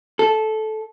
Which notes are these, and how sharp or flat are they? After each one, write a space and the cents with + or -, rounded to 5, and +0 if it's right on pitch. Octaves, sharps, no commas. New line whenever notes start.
A4 -15